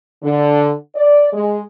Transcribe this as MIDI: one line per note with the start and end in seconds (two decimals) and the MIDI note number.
0.23 0.71 50
0.95 1.28 74
1.32 1.60 56